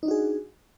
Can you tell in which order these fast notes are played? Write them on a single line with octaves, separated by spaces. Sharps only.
D#4 D4 F#4 G#4